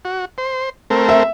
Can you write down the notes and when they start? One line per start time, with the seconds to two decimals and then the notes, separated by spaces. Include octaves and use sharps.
0.05 F#4
0.38 C5
0.90 A3 C4 A#4
1.09 E5